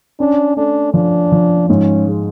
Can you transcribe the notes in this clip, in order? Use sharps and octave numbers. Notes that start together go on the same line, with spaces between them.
C#4 D4
A3 D4
F3 D4
F3
G#2 C#4
G#3